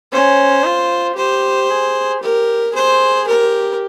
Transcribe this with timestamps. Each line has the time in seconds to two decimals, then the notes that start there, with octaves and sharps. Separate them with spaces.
0.12 C#4 C5
0.64 F4
1.17 G4 C5
1.70 G#4
2.22 G4 A#4
2.74 G#4 C5
3.27 G4 A#4